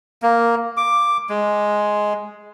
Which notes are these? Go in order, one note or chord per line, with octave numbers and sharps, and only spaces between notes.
A#3
D6
G#3